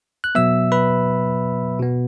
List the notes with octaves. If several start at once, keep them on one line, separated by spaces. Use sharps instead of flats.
F#6
B2 F#3 B3 E5 E6
B4 B5
B2 B3